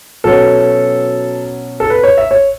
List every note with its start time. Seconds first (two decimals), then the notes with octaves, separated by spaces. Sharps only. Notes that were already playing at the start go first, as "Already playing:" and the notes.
0.24 B2 F#3 C#4 A4
1.80 A4
1.90 B4
2.04 C#5
2.17 E5
2.31 C#5